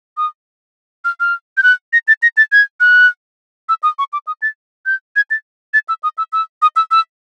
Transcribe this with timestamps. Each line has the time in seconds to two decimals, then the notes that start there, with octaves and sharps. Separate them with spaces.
0.17 D#6
1.05 F6
1.20 F6
1.57 G6
1.63 F#6
1.93 A#6
2.08 A6
2.23 A#6
2.37 A6
2.52 G#6
2.80 F#6
3.69 E6
3.83 D#6
3.99 C#6
4.13 D6
4.27 D#6
4.42 A6
4.86 G6
5.16 G#6
5.31 A6
5.74 A6
5.89 E6
6.03 D#6
6.18 E6
6.33 E6
6.62 D#6
6.76 E6
6.91 E6